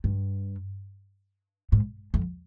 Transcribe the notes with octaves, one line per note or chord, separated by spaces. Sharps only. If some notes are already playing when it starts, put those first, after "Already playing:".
G2
G#2
F2